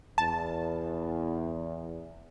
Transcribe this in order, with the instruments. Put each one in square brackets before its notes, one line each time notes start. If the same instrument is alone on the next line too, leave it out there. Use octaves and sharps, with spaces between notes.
[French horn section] E2 [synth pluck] A5